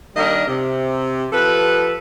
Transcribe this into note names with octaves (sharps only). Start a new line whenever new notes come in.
D#3 G3 A#3 D4 A#4 D#5
C3
F3 G4 A4 B4